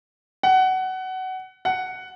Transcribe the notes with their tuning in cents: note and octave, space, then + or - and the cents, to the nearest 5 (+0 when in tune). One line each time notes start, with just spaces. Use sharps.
F#5 +20
F#5 +5